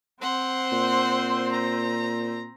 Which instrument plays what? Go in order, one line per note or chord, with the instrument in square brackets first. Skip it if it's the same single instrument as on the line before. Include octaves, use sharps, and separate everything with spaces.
[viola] C4 C5 [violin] F#5 C6
[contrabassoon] A#2
[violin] A#5